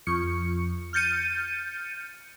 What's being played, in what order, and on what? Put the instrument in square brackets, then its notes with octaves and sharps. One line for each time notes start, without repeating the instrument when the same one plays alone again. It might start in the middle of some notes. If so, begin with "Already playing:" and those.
[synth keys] F2 C#6 C#7
F6 G6 A6 C#7 D#7